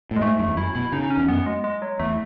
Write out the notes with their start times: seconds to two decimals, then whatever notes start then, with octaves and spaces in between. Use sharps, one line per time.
0.11 A2
0.16 G#3
0.21 G#2 A3
0.39 F#2 A3
0.48 E2
0.57 F#2 E4
0.75 B2 E4
0.92 C#3 D#4
1.03 D#4
1.10 C#4
1.17 E2
1.28 F#2 B3
1.46 G#3
1.64 G#3
1.82 F#3
1.99 E2 A3